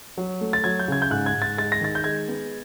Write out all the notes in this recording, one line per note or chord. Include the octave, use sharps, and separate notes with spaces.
F#3
A3
A6
F#3 G#6
G6
C#3 G#6
G6
G#2 F#6
G#6
G#2
A6
G#3 A6
A#6
D#3 A6
G6
G#3 G#6
B3